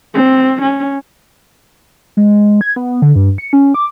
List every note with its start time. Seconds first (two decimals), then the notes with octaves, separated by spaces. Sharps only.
0.14 C4
0.62 C#4
2.17 G#3
2.61 G#6
2.76 B3
3.02 D3
3.15 G2
3.38 C#7
3.53 C#4
3.74 D6